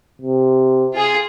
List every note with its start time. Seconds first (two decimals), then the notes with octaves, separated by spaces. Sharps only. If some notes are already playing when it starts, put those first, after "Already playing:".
0.22 C3
0.93 F4 G#4